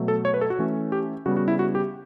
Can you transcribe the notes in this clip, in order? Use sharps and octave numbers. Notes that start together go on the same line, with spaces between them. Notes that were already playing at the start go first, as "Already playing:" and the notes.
Already playing: B2 F#3 A3
A4
C#5
B4
A4
F#4
E3 A3 C#4
G4
C#3 G3 B3 F#4
F#4
E4
F#4
G4